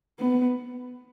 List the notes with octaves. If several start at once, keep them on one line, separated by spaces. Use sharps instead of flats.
B3